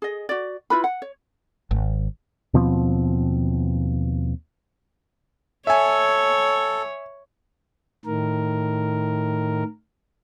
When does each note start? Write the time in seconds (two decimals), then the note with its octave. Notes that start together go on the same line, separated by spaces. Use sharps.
0.02 G#4 D#5
0.29 F#4 D5
0.70 E4 F4 B4 B5
0.84 F#5
1.02 C#5
1.71 G#1
2.54 D#2 B2 F3 C4
5.67 A4 C#5 E5 G#5
8.05 A2 D#3 A#4